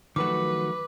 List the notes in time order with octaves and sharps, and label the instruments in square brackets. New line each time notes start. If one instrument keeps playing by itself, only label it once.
[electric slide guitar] D#3 F#4 [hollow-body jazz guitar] F3 F#3 A3 [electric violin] B4 [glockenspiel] D6